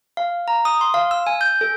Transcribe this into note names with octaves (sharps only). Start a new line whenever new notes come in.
F5
A#5
D#6
C6
F5
E6
G#5
G6
A4